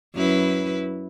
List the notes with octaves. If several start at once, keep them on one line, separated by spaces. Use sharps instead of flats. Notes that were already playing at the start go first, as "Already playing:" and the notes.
F#2 E4 B4